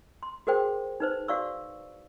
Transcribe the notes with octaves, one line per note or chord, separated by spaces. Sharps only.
C6
F#4 G#4 A#4 C5 G5
D#4 B4 C5
F#4 D5 F5 C#6 E6